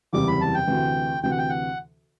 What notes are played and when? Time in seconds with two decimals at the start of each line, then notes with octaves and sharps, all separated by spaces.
0.13 F#1 E2 C3 G3 D6
0.27 B5
0.41 A5
0.54 G5
0.67 D2 C3 E3
1.23 D2 C3 E3 G5
1.31 F#5
1.38 G5
1.49 F#5